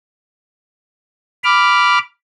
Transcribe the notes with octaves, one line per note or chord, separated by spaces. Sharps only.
B5 D6 F6